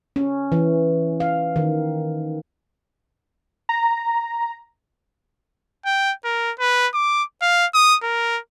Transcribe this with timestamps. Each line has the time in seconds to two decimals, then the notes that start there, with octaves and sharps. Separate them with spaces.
0.16 C#4
0.52 E3
1.20 F5
1.56 D#3
3.69 A#5
5.85 G5
6.24 A#4
6.59 B4
6.94 D6
7.42 F5
7.74 D#6
8.02 A#4